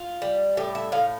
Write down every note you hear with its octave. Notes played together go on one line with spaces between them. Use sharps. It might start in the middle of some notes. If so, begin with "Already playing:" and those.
Already playing: F4
G3
A2 G4
E5
A2 F5